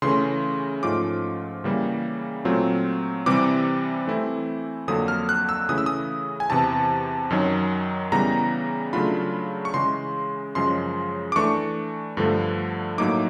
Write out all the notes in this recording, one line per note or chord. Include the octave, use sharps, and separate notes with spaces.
C#3 E3 A3 C#4 C6
G#2 F3 A3 C#4 F4 D6
C#3 E3 G3 A#3
A#2 F#3 A3 C4 F4
C3 E3 G3 C4 D6
E3 A3 C4 E4
F2 D3 F#3 A#3 D#6
F6
F#6
E6
C#3 E3 A3 C#4 E4 D#6
E6
D#6
G#5
E2 C3 E3 A5
F#2 D#3 F#3
C#3 E3 G3 B3 A#5
C#3 F#3 A3 D4 F4 B5
C#6
C#3 E3 G#3 C6
F#2 C#3 F3 G#3 C6
D6
E3 A3 D4 C#6
G2 D3 F3 A3
A2 F#3 A#3 D#4 D6